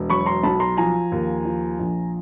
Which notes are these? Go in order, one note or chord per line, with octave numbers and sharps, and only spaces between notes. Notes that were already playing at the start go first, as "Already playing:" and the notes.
Already playing: E1
F#3 B5 C#6
A#5 C6
B1 A5 B5
A#5 C6
F3 G#5 A#5
D#2
F3
A#1